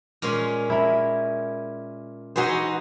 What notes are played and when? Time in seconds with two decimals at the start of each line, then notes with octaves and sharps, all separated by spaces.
0.22 A#2 G#3 C#4
0.70 E4 A#4
2.36 E3 D#4 F#4 G#4 C5